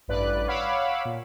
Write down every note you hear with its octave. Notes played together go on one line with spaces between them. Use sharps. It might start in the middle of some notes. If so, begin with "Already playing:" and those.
A1 G2 B4 D5 F#6
C#5 F5 F#5 B5 D6 E6
A#2